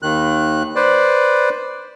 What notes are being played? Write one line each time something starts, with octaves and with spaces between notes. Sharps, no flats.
D#2 D#3 F#6
B4 C5 D5